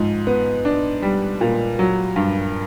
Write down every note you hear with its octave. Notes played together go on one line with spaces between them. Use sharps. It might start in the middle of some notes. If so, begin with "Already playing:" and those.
Already playing: G#2 F3
B3
D4
G3
A#2
F#3
G2